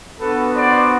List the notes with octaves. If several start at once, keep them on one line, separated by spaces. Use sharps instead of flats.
B3 D4 F#4 A4 B4
C5 D5